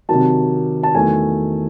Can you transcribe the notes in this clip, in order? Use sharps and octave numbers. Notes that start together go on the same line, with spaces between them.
C3 D#3 F#3 A5
A5
E2 D#3 F#3 A3 G#5